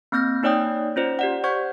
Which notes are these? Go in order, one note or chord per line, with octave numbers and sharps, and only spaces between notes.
A#3 C4 F6 G6 A#6
A#3 D#4 C#5 D5 G5 D#6
C#4 F4 C5 D5
G4 D5 F#5
C5 F#5 C#6 G6 G#6